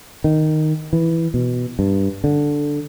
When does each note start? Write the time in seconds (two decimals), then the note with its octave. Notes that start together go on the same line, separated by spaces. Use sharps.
0.24 D#3
0.93 E3
1.34 B2
1.79 G2
2.24 D3